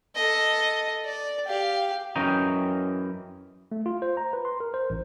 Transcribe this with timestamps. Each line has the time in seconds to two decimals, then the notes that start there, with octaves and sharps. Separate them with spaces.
0.15 A4 D#5
1.05 D5
1.47 G4 F5
2.16 F#2 E3 C#4 D#5 G5 A#5
3.72 A3
3.86 F4
4.02 C5
4.17 A#5
4.33 B4
4.45 C6
4.60 A#4
4.74 C5
4.90 A1